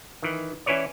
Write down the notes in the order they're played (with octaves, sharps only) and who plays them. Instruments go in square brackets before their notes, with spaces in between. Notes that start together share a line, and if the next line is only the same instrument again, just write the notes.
[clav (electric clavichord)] D#3 E3
E3 C#4 E4 B4 C#5 D5